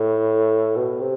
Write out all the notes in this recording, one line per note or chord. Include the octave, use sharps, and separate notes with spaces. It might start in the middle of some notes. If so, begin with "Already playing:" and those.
Already playing: A2
B2
C3